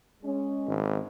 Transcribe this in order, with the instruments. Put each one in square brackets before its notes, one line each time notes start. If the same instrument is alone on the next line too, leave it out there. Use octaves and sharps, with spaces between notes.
[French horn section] G#3 C#4
[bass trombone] G#1